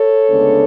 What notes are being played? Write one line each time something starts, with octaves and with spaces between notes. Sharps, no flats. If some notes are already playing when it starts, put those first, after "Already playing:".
Already playing: A4 C#5
D2 C#3 G#3 B3 D4